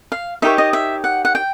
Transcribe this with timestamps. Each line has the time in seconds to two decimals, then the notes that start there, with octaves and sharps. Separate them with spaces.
0.12 F5
0.42 D#4 G4 A#4 C#5 E5
0.58 D#5
0.73 E5
1.04 F#5
1.25 F#5
1.35 G5